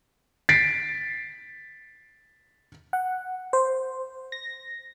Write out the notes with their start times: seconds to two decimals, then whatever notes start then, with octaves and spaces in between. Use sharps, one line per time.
0.49 A6 B6 C7 D7
2.93 F#5
3.53 C5
4.32 A#6